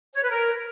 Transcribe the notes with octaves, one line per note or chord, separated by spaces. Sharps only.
C#5
B4
A#4